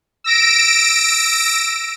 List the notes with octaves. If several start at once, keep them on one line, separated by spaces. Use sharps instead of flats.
E6 A#6 D7